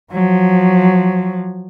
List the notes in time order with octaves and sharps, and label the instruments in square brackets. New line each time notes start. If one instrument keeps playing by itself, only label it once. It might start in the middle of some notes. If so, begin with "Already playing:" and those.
[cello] F3 F#3